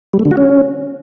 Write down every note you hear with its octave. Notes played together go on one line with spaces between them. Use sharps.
G3
A3
D3
F#4
C#4